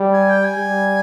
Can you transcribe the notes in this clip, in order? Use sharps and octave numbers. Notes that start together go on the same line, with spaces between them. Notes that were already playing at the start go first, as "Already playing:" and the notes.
Already playing: G3
G#5
G5
G#5
G3